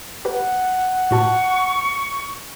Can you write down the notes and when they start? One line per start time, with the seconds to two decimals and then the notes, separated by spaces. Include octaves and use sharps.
0.25 G4 B4 F#5
1.11 A2 F#4 A5 C#6